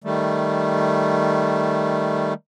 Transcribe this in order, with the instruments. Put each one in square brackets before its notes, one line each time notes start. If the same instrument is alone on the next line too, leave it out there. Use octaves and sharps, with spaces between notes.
[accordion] D#3 G3 A3